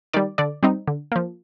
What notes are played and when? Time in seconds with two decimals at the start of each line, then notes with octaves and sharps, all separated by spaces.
0.13 D#3 G3 D5
0.38 D3 D5
0.63 G3 C4 D#4
0.88 D3
1.12 F3 A#3